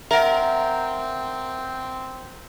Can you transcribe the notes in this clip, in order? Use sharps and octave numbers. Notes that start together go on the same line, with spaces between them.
C4 A#4 E5 F#5